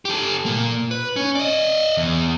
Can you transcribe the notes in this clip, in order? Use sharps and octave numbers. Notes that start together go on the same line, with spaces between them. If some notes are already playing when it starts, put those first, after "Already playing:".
G4 A4
A#2 A#3
B4
C#4
D5 D#5
E2